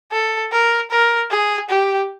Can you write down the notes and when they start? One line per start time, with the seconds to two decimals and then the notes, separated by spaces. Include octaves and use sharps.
0.12 A4
0.52 A#4
0.91 A#4
1.31 G#4
1.69 G4